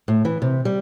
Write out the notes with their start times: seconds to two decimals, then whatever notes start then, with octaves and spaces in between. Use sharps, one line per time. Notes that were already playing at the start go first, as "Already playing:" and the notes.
0.08 A2
0.25 E3
0.42 C3
0.65 G3